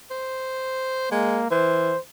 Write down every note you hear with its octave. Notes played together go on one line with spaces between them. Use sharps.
C5
G#3 A#3
E3 C5